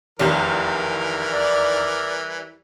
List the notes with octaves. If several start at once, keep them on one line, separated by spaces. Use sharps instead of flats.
F1 E2 D#3 E3 G3 A#4
D5